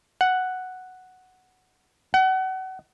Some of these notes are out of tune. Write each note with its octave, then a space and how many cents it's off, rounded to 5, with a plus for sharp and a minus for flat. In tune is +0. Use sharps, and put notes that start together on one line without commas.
F#5 +0
F#5 +30